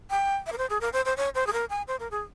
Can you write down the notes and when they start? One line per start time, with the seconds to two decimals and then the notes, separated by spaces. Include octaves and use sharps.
0.11 G5
0.47 E5
0.52 A#4
0.58 C5
0.70 G#4
0.81 A#4
0.93 C5
1.05 C5
1.17 C#5
1.35 C5
1.47 G#4
1.53 A#4
1.70 G#5
1.88 C5
2.00 A#4
2.11 G#4